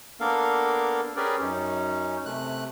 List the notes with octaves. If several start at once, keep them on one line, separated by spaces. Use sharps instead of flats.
A#3 B3 D4 A4 A#4 F5
C#4 G4 G#4 A#4 B4 D5
F#2 C#4 D#4
C3 A3 F#6